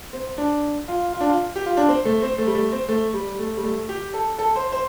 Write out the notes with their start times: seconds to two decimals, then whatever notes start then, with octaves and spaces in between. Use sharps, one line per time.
0.13 C4
0.38 D4
0.88 F4
1.13 F4
1.21 D4
1.29 F4
1.56 G4
1.66 F4
1.77 D4
1.88 C4
2.05 A3
2.22 C4
2.38 A3
2.47 G3
2.55 A3
2.72 C4
2.89 A3
3.14 G3
3.39 A3
3.57 G3
3.63 A3
3.89 G4
4.14 A4
4.39 A4
4.56 C5
4.72 C5